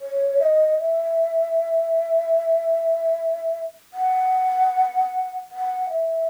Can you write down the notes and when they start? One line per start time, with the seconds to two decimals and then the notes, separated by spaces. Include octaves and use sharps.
0.01 C#5
0.40 E5
0.43 D#5
0.79 E5
3.94 F#5
5.51 F#5
5.90 E5